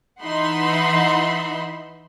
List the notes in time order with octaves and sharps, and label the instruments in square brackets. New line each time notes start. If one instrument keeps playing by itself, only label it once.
[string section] E3 D#4 E5 F#5 B5 C6